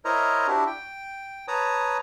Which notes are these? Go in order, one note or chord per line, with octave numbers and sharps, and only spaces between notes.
E4 A#4 C5 C#5 D#5 A#5
D4 E4 F#4 G4
G5
B4 C#5 A5 A#5 D#6